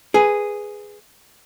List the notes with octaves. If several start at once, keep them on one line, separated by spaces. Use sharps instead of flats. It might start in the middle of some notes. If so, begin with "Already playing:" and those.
G#4 B4